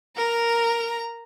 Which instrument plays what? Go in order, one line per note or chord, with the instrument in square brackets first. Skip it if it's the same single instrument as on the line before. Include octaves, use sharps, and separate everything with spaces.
[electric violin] A#4 [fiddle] A#5